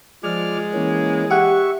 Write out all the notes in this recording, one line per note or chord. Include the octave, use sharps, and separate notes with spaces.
F3 G#3 D5 F6
E3 A#3 C#4
G4 E5 F#5 C#6